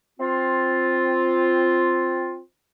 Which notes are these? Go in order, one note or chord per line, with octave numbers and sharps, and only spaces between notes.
C4 F4